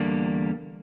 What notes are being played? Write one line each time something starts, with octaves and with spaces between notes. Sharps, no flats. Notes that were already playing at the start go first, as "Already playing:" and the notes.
Already playing: E2 D3 G3 A#3